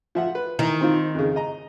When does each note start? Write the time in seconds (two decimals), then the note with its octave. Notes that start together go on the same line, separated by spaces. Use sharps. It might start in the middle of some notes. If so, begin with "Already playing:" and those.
0.15 F3 E5 F#5
0.35 B4
0.59 D#3 E3
0.81 C4 D#4 F4
1.15 F2 C#3
1.36 D#5 A#5